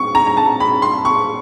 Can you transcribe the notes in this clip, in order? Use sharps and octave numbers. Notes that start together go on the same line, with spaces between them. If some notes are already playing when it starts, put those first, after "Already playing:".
Already playing: C#6
A#5
A#5
A5
B5
C6
C#6